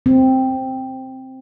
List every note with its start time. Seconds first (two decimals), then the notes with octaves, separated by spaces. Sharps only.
0.06 C4